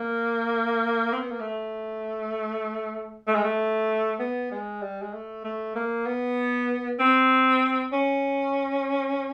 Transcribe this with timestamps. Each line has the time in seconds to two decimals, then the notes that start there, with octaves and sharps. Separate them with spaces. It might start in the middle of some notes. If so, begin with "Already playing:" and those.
Already playing: A#3
1.13 C4
1.21 B3
1.31 A#3
1.40 A3
3.27 A3
3.35 G#3
3.44 A3
4.20 B3
4.52 G#3
4.82 G3
5.02 G#3
5.13 A3
5.45 A3
5.76 A#3
6.06 B3
7.00 C4
7.93 C#4